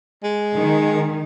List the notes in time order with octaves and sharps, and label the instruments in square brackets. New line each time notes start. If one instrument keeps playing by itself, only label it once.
[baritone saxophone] G#3
[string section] D#3